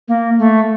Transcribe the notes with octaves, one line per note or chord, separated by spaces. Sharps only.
A#3
A3